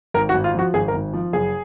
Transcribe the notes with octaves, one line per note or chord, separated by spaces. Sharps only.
G#1 A#4
F#4
G#1
F4
F3 F#4
G#1 G#4
A#4
G#1
F3
F#1 G#4